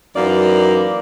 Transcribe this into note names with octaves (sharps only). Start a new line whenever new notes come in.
F#2 E3 A#3 D#4 D5